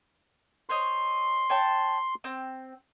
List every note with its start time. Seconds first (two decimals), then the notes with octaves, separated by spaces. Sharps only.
0.69 C5 C#5 D#5 C6
1.50 C#5 G5 A5
2.24 C4 G5